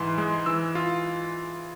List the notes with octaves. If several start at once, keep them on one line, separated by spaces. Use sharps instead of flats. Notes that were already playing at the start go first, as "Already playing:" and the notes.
Already playing: G#2 E3 C6
G#3
E3 E6
F4